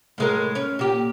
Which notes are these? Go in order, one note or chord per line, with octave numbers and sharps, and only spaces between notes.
A2 G#3 A#4
C#4
A#2 G4